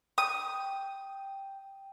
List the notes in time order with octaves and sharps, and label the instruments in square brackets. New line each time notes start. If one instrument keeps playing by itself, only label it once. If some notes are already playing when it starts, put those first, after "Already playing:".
[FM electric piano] G5 [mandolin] D#6